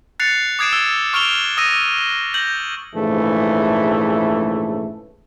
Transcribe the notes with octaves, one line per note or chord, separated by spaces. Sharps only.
F#6 A6 C7 C#7 F7
D6 D#6 G#6 C7 D7 E7
E6
C#6 F6 D7 F7 G7
D#6 E6 A#6 D#7
G6 A#6 F#7
A#1 G#2 C#3 E3 A3